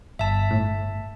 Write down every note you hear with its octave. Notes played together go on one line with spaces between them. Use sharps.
G1 E5 A5
A2